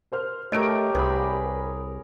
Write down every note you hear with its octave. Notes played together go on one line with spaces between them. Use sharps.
A#4 C5 F6
A3 G4 A#4 C#5 D#5 D7
C2 G#4 B4 B5